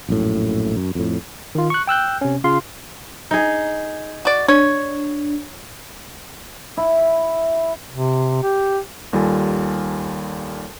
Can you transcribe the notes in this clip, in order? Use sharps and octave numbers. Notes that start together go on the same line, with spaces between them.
A#1 F#2 A2
F#2
F2 A2
D#3 F4
C#6 F#6
G5 E6 F#6 G6
C3 C#4
C#3 F4 F5 C6
D#4 G#4
F#4 D5
D4 C#5
E4
C3
G4
D#2 G3 F4 A4 G#5